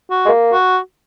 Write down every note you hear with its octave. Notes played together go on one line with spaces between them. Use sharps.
F#4
G#3
A#3
F#4